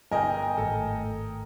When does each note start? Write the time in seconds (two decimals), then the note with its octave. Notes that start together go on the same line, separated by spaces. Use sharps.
0.11 G1 A#4 D#5 G5 G#5
0.58 G#1 A2 A4